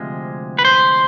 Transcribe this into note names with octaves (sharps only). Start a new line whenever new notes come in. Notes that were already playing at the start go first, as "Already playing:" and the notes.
Already playing: D2 C3 F3 G#3
B4
C5